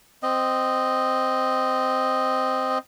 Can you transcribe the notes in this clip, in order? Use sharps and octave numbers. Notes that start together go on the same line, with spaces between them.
C4 D#5